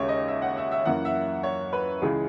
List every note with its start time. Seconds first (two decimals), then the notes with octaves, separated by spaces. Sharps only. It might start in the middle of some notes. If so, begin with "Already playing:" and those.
Already playing: D#2 C#3 G#3 C#5 E5
0.09 D#5
0.28 E5
0.42 F#5
0.57 E5
0.71 E5
0.85 F#2 E3 A#3 F#5
1.05 E5
1.43 C#5
1.73 B4
2.02 C#2 C#3 E3 G#3 G#4